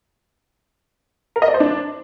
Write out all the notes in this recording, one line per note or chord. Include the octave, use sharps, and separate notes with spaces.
A#4
D#5
D5
C5
D4